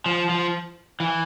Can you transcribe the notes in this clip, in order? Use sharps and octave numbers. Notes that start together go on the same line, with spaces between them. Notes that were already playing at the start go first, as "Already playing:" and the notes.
F3
F3
E3